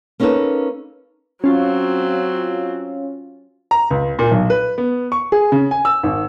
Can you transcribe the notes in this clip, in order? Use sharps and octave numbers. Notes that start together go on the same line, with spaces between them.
A#3 C#4 D#4 G4 A4 B4
F#3 C4 C#4 F4
A#5
C#2
A#2
B1
B4
B3
C#6
G#4
C#3
G#5
E6
G#1